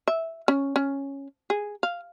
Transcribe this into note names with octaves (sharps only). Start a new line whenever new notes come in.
E5
C#4
C#4
G#4
F5